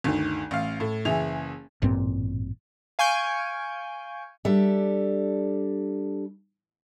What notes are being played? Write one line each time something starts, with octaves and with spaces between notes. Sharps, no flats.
G1 D2 D#3
A1 F5
A2
F#1 E3 G#4 E5 F7
A1 G2 A#2 C4
F5 G#5 C#6 G6 D7
G3 D4 A4 E5